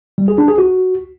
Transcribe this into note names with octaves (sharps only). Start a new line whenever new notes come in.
G3
G#4
D4
G#4
F#4